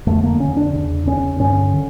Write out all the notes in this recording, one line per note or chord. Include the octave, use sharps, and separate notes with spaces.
F2 D3 A3
A#3
F2 D3 C#4
D4
E2 C#3
E2 C#3 C#4
G2 D3 C#4
D3